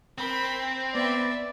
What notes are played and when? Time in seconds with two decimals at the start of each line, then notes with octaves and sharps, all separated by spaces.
0.18 C4 A#4 B5
0.95 B3 B4 D5 E5